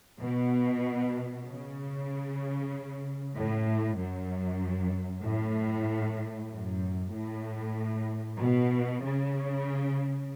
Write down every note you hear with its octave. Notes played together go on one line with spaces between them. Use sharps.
B2
C#3
A2
F#2
A2
F#2
A2
B2
C#3